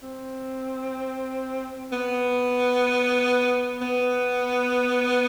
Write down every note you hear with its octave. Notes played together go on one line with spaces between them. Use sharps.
C4
B3
B3